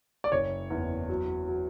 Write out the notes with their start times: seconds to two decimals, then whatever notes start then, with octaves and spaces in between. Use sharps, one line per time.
0.24 D5
0.32 F#1 C#5
0.70 E2
1.09 F#3
1.48 F#3